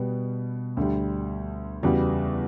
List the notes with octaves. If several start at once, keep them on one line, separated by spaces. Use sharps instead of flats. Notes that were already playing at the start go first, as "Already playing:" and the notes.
Already playing: B2 G3 B3
D2 D3 G3
E2 C#3 G3 B3 F#4